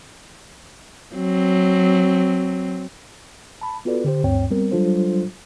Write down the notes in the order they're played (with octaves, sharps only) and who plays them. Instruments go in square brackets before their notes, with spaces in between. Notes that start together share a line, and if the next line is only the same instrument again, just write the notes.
[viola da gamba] F#3 C4
[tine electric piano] A5 B5
B3 F4 F#4 A4 B4 D5
D3 G4 C5
D2 G2 C4 C#5 G5
G3 B3 C4 A#4
F#3 G3 D4 F4 A4 C5